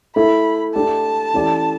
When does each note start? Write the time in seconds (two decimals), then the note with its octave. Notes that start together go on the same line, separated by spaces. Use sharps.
0.16 A3 E4 A4 B5
0.75 A3 D4 G4 A5
1.34 E3 A3 C#4 G4 D5